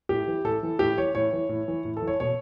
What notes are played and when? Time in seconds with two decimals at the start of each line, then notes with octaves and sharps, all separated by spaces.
0.09 A2 G4
0.28 E3
0.44 A2 A4
0.63 E3
0.79 A2 G4
0.97 E3 C#5
1.15 A2 C#5
1.33 E3
1.49 A2
1.68 E3
1.85 A2
1.97 A4
2.02 E3
2.07 C#5
2.20 B2 C#5